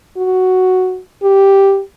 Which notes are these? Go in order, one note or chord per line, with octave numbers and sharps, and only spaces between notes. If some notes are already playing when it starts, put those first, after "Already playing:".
F#4
G4